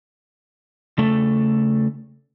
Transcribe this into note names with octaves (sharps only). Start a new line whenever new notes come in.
C#3 A3 A4